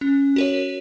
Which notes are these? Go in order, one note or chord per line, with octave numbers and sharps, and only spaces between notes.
C#4
F#4 A#4 C#5